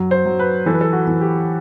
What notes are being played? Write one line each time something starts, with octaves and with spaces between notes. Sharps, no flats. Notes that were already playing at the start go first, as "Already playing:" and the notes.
Already playing: F#2 F#3
C5
F#3
B4
E3 A4
B4
A4
F#4
E3
G4